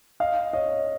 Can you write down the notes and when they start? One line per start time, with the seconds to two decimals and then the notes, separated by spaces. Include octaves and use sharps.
0.20 D#5 F5
0.53 C#5 D#5